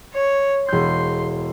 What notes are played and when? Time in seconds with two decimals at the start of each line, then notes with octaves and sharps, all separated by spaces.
0.14 C#5
0.69 E1 C6 G6